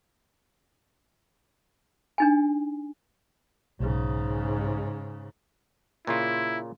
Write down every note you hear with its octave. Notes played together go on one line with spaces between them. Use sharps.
D4 D#4 G#5
B1 G#2 C#3
A#2 C#3 E4 F4